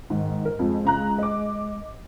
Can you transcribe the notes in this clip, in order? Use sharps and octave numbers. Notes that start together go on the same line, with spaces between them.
G#2 D#3
A#4
F2 G#3
C#2 A#5 F#6
D#5 D6